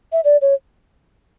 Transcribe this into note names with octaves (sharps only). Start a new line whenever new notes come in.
E5
D5
C#5